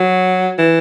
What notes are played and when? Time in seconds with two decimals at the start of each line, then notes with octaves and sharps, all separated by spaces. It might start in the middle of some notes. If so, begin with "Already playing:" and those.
Already playing: F#3
0.59 E3